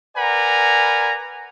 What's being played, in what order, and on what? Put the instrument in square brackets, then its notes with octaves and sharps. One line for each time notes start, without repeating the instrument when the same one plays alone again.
[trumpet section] A#4 B4 D5 F#5 G#5 A#5